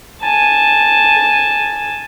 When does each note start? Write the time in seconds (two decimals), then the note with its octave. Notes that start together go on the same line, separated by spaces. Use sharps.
0.22 G#5 A5